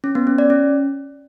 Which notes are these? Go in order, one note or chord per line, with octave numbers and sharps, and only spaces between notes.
C#4
B3
C#4
D5
C#4